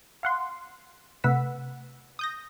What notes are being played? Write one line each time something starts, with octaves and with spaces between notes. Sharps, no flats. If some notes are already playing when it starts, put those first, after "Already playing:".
F5 F#5 C6
C3 A3 B4 F#5 E6 B6
D#6 G6 A#6